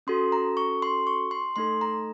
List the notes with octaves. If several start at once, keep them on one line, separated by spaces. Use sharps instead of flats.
C#4 F#4 A4 C6
A#5
C#6
C6
C#6
C6
A3 D#4 A4 C6
A#5